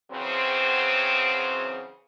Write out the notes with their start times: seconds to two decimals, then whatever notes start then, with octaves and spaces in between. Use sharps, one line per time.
0.11 E2 C#3 F#3 C4